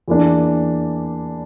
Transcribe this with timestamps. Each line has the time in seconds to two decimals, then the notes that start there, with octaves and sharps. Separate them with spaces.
0.08 E2 E3 A#3 D4